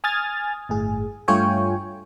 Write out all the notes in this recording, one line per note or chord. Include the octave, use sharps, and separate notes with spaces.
G#5 D#6 F6 G#6 A6
G1 A2 G#4
G2 A3 F4 C#5 G5 G#5